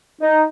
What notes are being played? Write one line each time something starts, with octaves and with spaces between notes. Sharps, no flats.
D#4